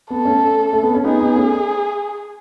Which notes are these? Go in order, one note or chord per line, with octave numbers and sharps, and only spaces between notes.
B3 A4
A3 C#4
A3
B3
C#4
B3 D#4 G#4
B3 D#4
A3 C#4